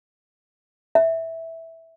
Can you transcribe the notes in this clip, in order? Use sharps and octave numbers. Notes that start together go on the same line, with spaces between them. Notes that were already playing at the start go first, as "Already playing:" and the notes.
E5